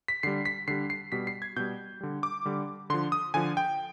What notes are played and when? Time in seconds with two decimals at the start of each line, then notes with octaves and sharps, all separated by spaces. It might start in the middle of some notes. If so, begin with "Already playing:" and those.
0.08 B6
0.23 D3 G3 C7
0.46 B6
0.68 D3 G3 C7
0.90 C7
1.12 B2 G3 B6
1.27 C7
1.42 G#6
1.56 B2 G3 G6
2.01 D3 G3
2.23 D6
2.45 D3 G3
2.90 D3 F3 C6
3.12 D#6
3.34 D3 F3 G#5
3.57 G5